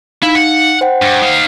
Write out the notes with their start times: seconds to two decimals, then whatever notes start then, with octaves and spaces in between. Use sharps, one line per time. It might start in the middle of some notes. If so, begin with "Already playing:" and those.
0.22 D#4 E4 F5
0.35 F#5
0.81 C5 F#5 G5
1.02 G2
1.22 D#4 F5